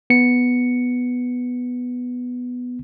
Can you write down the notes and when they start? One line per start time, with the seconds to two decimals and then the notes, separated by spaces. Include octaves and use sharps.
0.10 B3 C#7